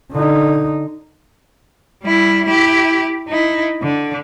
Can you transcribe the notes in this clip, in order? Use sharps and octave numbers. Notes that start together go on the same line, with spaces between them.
D3 D#4
G3 E4
E4 G4
D#4 E4
D3